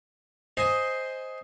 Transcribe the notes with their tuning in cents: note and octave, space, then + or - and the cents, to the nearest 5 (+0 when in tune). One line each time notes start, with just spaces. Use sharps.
C5 +0 D#5 +10 G#5 +0